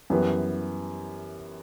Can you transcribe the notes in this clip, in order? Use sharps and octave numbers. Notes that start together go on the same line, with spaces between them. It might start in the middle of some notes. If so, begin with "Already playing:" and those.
F#2 E3 G3 B3